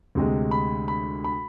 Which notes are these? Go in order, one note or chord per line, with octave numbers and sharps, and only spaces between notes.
D2 C3 G#3
B5
B5
B5